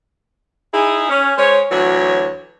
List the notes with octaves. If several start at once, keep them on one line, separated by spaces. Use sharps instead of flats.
D#4 E4 G#4
C#4
G#3 C#4 C5 C#5
D2 E3 F#3 F#4 C#5